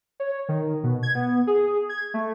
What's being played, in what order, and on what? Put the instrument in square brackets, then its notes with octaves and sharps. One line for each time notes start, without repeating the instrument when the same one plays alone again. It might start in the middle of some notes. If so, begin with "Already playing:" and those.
[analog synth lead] C#5
D#3
B2
G#6
B3
G#4
G#6
A3